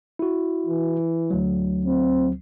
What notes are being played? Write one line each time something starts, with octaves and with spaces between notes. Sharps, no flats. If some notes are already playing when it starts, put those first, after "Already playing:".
E4 F#4
E3
D2 F#3
C4